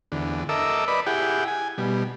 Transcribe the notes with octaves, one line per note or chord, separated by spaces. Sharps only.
E2 D3
A4 A#4 D#5 E5 D6 E6
B4 D5 D#5 B5
E4 G4 G#4 F#5 G5
G#5
B2 G3